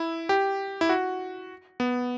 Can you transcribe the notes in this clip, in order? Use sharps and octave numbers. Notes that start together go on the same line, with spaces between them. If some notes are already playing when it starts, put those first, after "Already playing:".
Already playing: E4
G4
E4
F#4
B3